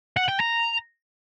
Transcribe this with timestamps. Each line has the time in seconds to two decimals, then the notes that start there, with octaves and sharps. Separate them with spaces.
0.17 F#5
0.28 G5
0.40 A#5